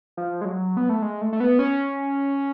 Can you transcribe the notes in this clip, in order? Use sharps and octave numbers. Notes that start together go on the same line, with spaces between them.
F3
G#3
F#3
B3
A3
G#3
A3
A3
B3
C#4